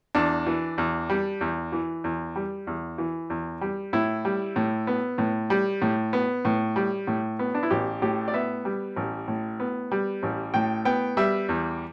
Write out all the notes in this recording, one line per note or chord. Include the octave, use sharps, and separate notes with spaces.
E2 D4
E3
E2
G3
E2
E3
E2
G3
E2
E3
E2
G3
A2 E4
G3
A2
B3
A2
G3
A2
B3
A2
G3
A2
B3
D4
E4
A1 G4
A2 G4
D5
B3 E5
G3
A1
A2
B3
G3
A1
A2 G5
B3 G5
G3 E5
E2